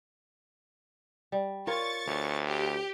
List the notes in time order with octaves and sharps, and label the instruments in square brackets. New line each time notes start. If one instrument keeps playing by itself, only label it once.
[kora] G3
[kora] F4 A#4 C#5 [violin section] C#6 A6
[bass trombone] D2 [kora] C#5
[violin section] G4